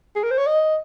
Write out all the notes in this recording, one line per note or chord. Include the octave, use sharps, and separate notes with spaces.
G#4
A#4
C5
C#5
D#5